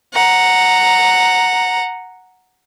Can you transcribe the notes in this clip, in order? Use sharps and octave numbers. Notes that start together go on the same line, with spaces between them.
F#5 A#5